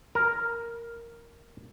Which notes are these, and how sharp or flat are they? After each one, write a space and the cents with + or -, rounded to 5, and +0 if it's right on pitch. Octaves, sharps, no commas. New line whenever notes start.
A#4 +0 G#5 +35